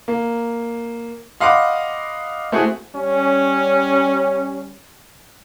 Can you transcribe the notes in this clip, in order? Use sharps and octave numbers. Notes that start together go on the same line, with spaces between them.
A#3
D#5 F5 F#5 B5 C6 D6
A3 C4 E4 F#4 G#4
G3 C#4